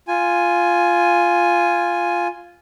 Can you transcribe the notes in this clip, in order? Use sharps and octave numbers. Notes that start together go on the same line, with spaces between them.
F4 G#5